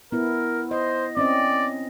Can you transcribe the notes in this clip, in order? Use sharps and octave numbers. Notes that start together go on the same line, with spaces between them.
B3 E4 A#4
C5 D#5
C4 C#4 D5 D#5